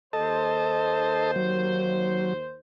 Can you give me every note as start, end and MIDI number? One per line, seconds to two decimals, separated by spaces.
0.13 2.58 39
0.13 1.31 69
0.13 2.58 72
0.13 1.31 75
0.13 1.31 81
1.36 2.33 54